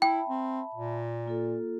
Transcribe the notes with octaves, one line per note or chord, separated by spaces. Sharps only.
E4 E5 G5 A5 B5
C4
A#2
A#3 F4 A4